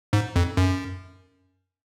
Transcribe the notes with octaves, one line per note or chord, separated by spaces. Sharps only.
G#2
F2
F#2